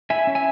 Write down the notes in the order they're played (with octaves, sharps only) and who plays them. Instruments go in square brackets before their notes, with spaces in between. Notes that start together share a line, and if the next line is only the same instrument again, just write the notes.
[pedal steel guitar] E4 E5 G#5
C#4
E5 G#5